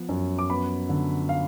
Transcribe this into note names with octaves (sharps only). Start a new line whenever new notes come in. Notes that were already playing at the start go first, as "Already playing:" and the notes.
Already playing: F3 B3
F#2
D6
B3 B5
D3
F5